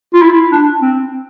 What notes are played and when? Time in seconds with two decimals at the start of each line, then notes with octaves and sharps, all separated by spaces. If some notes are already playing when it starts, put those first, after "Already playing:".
0.14 F4
0.22 E4
0.52 D4
0.81 C4